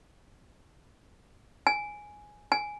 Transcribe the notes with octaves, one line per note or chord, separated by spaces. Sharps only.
G#5
G#5